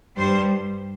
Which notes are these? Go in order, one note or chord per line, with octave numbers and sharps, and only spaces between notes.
G2 G3 C5